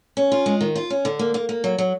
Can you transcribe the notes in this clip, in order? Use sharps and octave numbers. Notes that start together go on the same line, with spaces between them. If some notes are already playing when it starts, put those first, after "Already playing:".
C#4
F4
G#3
D#3
F4
C#4
D3
A#3
A#3
A#3
F#3
F#3